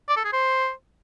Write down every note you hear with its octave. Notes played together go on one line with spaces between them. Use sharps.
D5
A4
G#4
C5